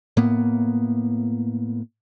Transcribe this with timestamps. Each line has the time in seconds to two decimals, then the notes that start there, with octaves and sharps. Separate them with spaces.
0.17 A2 A#3 B3